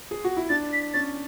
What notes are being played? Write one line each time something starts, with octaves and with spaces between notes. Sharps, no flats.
G#4
F#4
E4
D4 A6
B6
C#4 A6